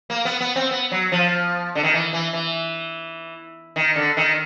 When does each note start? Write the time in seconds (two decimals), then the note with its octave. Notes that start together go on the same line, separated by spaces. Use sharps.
0.10 A#3
0.25 B3
0.40 B3
0.56 C4
0.71 B3
0.91 F#3
1.12 F3
1.75 D3
1.83 D#3
1.93 E3
2.13 E3
2.33 E3
3.76 D#3
3.96 D3
4.17 D#3